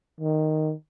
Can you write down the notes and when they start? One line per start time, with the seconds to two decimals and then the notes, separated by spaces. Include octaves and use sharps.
0.20 D#3